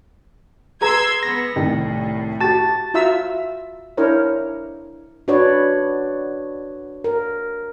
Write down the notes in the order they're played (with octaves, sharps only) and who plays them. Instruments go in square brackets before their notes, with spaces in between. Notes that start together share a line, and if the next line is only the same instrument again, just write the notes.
[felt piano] G#4 B4 A#5 [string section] C6 E6 G#6
[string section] B3 [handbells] A#6
[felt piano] C2 D#3 [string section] A2
[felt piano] F#4 G4 [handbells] A5 A6
[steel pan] F4 F#4 E5 A#5 E6
D4 E4 A#4 C5 C#5
[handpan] D4 F#4 B4 C#5 D5
A#4